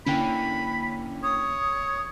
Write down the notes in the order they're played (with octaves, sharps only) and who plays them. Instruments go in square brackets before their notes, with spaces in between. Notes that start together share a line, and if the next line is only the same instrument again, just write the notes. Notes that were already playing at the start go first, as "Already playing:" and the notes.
[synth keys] D3 A#3 C#4 [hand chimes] D4 E4 G5 [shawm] B5
[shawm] C#5 [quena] D#6